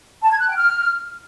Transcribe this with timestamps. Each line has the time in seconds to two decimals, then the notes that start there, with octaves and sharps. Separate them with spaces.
0.22 A5
0.31 G#6
0.40 F#6
0.48 G5
0.57 F6